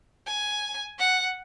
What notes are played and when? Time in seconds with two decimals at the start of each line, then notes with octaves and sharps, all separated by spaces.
0.27 G#5
0.99 F#5